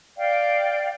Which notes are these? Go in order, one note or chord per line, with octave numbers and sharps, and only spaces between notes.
D5 F5 G5